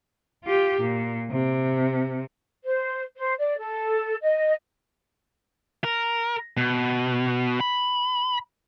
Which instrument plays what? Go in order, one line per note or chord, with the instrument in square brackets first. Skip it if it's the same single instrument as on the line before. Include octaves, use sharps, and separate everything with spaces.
[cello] F4 G4
A#2
C3
[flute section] C5
C5
D5
A4
D#5
[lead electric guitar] A#4
B2
B5